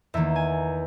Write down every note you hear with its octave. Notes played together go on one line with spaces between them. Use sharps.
E2 D#3 A#3 E5
G#5